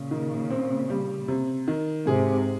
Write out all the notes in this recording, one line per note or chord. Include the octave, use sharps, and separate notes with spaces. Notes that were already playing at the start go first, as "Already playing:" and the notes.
Already playing: A#2 C#3
D#3
C4
G3
C3
D#3
G#2 C3 G#4